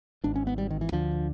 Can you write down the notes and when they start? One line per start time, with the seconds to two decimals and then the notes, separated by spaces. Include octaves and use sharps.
0.24 G#1 G#2 D4
0.36 C#4
0.47 B3
0.58 G3
0.71 D#3
0.81 E3
0.92 D2 D3 F3